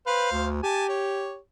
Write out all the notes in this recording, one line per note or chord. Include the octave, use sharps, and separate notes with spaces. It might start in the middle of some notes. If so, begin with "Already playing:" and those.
B4 C5 F5
D2
G4 G#5 A5
C#5